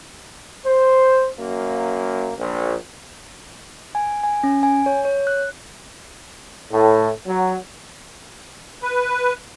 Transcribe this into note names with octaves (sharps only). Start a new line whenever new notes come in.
C5
F#2 A#3
A#1
G#5
G#5
C#4
G#5
C#5
C#5
F#6
A2
F#3
B4